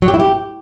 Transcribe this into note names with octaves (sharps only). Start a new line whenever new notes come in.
F#3
G4
E4
G4